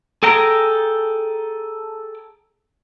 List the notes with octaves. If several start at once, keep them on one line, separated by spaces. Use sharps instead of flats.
G#4 A4 G5 A#5